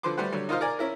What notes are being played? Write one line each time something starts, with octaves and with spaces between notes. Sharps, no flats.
D3 F3 B4 C5 C6 D6
G3 A3 B4 C5 F#5
D3 F#3 G3
D#4 F4 A#4 C5 D#5 F5
A#4 D5 G#5
C#4 E4 A#4